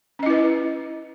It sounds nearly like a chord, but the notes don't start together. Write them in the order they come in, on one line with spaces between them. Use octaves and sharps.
C#4 D#5 E4 B4